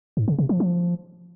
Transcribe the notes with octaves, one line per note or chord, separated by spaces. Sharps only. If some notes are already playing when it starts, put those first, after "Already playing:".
G#2
C#3
C3
F3
F3